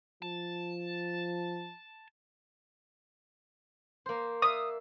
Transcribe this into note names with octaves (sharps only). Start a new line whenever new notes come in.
F3 A5
A#3 C5
D5 E5 F5 D#6